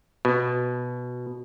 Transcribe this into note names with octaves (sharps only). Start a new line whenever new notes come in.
B2